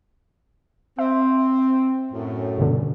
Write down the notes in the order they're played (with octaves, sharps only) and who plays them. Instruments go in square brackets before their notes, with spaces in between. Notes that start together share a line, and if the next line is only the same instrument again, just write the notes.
[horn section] C4 [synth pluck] E5
[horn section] F#2 A2
[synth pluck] G2 B2 D3